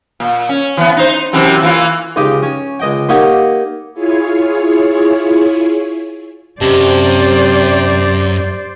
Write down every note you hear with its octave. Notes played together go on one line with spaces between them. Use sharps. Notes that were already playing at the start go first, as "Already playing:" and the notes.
A#2
C#4
E3 B3
D#4 C5
F#2 C3 E3
E3 A#3 F4
C#2 D#4 G4 F5 G5
C#4
C#2 D#5 G5
A#3 D#4 G4 C#5 F5 F#5
E4 F4 G#4 C#5
F#2 C3 G4 C5 D5 D#5 A5